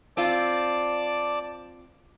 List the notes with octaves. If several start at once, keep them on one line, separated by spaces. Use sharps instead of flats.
C4 F4 D5 A5 D6